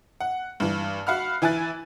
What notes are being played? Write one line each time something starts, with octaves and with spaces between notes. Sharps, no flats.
F#5
G2 E3
F#4 F5 F#5 B5 F6
E3 E4 G#5 F#6 A6